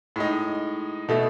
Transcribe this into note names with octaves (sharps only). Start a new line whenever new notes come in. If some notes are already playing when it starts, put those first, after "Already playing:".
A2 G#3 D#4
B2 A3 E4